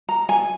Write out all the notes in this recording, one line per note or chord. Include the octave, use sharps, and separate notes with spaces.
A#5
G#5